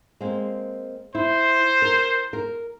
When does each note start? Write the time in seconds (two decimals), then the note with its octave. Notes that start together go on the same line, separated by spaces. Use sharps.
0.21 G#3 A#3 C4
1.15 E4 C5
1.82 A#4
2.33 A#4